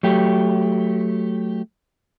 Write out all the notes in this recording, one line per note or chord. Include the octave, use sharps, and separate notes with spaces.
F#3 A3 G4